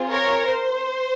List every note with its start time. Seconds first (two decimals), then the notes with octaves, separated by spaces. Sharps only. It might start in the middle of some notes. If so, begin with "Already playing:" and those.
Already playing: C4 F4 G#4
0.11 A#4 C#5
0.48 C5